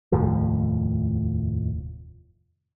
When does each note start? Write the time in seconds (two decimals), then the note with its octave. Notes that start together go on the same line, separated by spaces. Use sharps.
0.12 F1 D#2 A2 F3